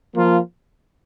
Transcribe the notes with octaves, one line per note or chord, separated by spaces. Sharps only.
F3 A#3 F4